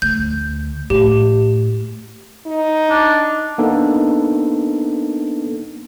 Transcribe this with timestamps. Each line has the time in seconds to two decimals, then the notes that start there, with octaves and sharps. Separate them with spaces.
0.02 D2 G6
0.90 A2 G4
2.46 D#4
2.90 D4
3.58 A#3 B3 D4 D#4 A4